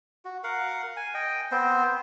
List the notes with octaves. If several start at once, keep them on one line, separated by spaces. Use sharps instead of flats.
F#4
A#4 F5 F#5
G#5
D#5 G5
B3 C4 C5